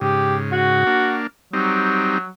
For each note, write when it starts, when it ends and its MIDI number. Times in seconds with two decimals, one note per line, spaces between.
0.01 0.84 44
0.01 0.84 49
0.01 0.36 67
0.52 1.17 66
0.87 1.27 58
0.87 1.27 62
1.53 2.28 54
1.53 2.18 55
1.53 2.18 60
1.53 2.18 63